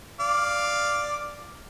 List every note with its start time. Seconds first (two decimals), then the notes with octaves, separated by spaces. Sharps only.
0.20 D5 F5